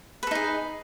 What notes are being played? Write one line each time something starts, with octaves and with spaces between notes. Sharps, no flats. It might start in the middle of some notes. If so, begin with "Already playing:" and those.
D#4 G#4 A4 B4